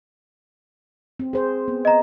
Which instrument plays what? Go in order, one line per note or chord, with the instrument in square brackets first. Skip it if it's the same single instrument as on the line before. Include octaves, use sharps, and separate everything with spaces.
[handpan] C4
G#4 C5
B3
[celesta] D#5 A#5